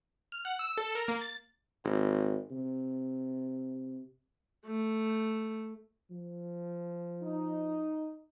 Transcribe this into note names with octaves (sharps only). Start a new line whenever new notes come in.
F6
F#5
E6
A4
A#4
A#3
A6
G#1
C3
A3
F3
D#4